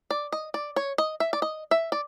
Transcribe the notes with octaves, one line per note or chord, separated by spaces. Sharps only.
D5
D#5
D5
C#5
D#5
E5
D5
D#5
E5
D5